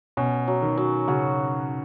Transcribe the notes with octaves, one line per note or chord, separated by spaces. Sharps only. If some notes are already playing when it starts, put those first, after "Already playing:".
B2 C#4
F#3
D#3
F#3
C#3 F#4